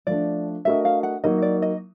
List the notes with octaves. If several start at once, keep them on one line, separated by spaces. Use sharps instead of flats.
F3 A3 D4 D5
A3 D4 F#4 A#4 D#5 E5
F5
F#5
F#3 A#3 D#4 D#5
D5
D#5